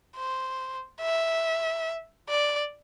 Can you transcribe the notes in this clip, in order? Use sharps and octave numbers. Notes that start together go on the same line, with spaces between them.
C5
E5
D5